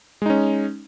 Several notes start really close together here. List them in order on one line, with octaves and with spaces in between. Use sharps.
G#3 D#4 C#4